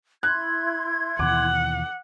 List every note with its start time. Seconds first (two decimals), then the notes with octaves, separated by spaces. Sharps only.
0.23 E4 C6 F#6 G#6
1.19 D#2 B2 E3 F#5 D6